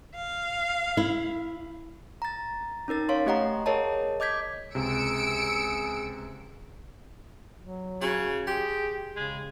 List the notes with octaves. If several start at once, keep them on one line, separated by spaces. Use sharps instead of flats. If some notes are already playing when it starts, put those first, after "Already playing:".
F5
E4
A#5 A6
C#4 D#4 A#4 A6
C#5 F5 C6
A3 G4 D#5 F#5 A#5
G#4 A#4 C#5 D#5 A5
D#5 D6 G6 G#6 B6
C#2 C3 G#4 E6 C#7 D7
F#3
C#3 F#4
G4 G#4 C6
C#3 G#3